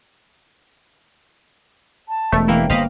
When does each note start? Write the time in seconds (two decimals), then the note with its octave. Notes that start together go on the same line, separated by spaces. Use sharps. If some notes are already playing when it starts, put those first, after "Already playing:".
2.09 A5
2.32 E1 A3
2.48 E3 A#3 E4 G5
2.70 G1 A#3 C5 D#5 F5 B5